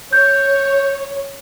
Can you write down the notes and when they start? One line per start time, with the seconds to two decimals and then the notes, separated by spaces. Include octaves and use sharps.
0.13 C#5 G6